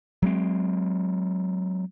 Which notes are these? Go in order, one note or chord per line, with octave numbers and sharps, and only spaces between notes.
F#3 G#3 C4